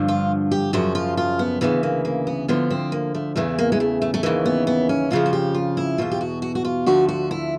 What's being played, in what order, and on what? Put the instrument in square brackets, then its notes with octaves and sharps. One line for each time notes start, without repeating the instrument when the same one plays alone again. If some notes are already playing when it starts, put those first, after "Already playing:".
Already playing: [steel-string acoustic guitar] G2 D3 F3
F4
G4
F#2 C#3 F3 F#4
F4
F4
B3
D2 C#3 E3 B3
A#3
A#3
B3
D2 D3 F3 B3
C4
A#3
A3
E2 C#3 E3 A3
A#3
G#3
A3
A3
A3
D#2 C#3 E3 A#3
B3
B3
C#4
F2 C#3 F3 F4
F#4
G4
F4
E4
E2 B2 F4
G4
F#4
F#4
F#4
F4
D2 D3 F3 F#4
F#4
E4